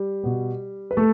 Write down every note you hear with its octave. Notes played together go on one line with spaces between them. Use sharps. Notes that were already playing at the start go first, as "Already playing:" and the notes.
Already playing: G3
B2 B3
B4
A3 A4